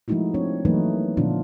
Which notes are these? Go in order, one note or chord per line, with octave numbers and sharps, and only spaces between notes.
F3 G#3 A3 D#4 E4 F#4
C4 D4 C#5
E3 F#3 A3 A#3 D#4 B4
A#2 D3 F3 B3 D4 F4